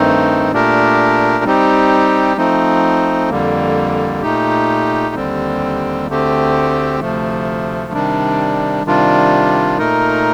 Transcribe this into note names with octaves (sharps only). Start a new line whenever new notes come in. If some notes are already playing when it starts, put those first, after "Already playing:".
Already playing: G2 D#3 A3 C4 D#4
A#2 A3 D4 G4 A#4
G3 C4 D#4 G4
F3 A3 C4 D#4
F2 D3 G3 A#3
A#2 A3 D#4 G4
D#2 D3 G3 C4
D2 D3 A3 C4 G4
D2 C3 F3 A3
C3 D#3 G3 D4
C3 D#3 G3 D4 F4
A#2 A3 D#4 A#4